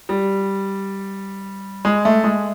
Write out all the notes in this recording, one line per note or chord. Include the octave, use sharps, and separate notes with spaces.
G3
G#3
A3
G#3